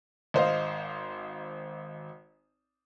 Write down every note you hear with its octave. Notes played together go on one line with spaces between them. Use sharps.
G#1 C5 D#5 F5